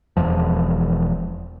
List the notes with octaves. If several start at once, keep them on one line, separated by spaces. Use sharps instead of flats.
E1 E2 F3